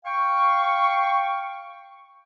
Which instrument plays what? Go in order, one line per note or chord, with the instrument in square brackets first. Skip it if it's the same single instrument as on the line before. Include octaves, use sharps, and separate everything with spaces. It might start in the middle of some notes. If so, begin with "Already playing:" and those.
[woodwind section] F5 G5 C#6